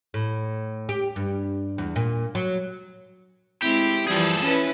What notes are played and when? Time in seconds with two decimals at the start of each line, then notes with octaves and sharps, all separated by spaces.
0.14 A2
0.89 G4
1.16 G2
1.78 E2
1.96 A#2
2.35 F#3
3.62 G#3 C4 E4 G4
4.07 E3 F3 G3 G#4 A4
4.40 C#4 E4 B4